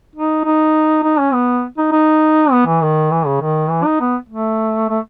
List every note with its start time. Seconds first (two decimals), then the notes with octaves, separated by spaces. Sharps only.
0.15 D#4
0.45 D#4
1.03 D#4
1.19 C#4
1.33 B3
1.78 D#4
1.92 D#4
2.51 B3
2.66 E3
2.82 D#3
3.11 E3
3.26 C#3
3.41 D#3
3.70 E3
3.84 D#4
4.00 B3
4.29 A3
4.89 A3